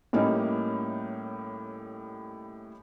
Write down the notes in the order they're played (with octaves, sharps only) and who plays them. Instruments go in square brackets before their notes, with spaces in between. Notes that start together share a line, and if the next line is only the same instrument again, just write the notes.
[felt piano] A2 G3 A#3 C#4 D#4 E4